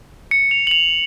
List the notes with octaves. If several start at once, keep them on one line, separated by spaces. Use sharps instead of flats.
C#7
F7
F#7
F7